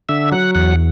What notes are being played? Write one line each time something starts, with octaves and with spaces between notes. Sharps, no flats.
D3 E5
F#3 F#5
E2 F#5